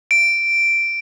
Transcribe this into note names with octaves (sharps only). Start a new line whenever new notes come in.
D7